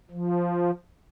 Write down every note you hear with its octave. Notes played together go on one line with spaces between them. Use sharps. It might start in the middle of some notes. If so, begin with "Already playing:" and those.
F3